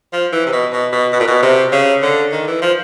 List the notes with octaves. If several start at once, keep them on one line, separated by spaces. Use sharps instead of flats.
F3
E3
C3
B2
B2
B2
B2
A#2
B2
C3
C#3
D3
D#3
E3
F3